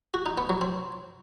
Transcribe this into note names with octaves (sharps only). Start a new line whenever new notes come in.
F#4
D#4
B3
F#3
C4